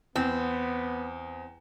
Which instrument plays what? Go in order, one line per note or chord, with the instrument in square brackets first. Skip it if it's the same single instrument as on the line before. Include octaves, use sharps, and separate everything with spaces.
[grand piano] E2 [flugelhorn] B3 [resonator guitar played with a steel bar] C4